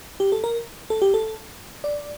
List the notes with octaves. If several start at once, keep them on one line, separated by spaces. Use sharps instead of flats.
G4
A4
A#4
A4
G4
A4
D5